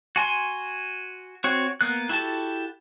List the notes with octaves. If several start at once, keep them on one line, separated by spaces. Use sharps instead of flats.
F#4 G#5 C6
C4 F#4 C#5
A#3 B3 F#6
E4 F#4 G4 A4 A5